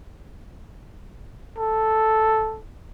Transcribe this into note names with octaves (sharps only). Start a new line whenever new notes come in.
A4